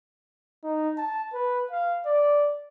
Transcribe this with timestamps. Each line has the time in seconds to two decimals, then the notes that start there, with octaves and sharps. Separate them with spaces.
0.64 D#4
0.97 A5
1.34 B4
1.71 F5
2.06 D5